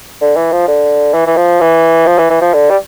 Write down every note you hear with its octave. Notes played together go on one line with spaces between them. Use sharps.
D3
E3
F3
D3
E3
E3
F3
E3
F3
E3
E3
F3
D3
G3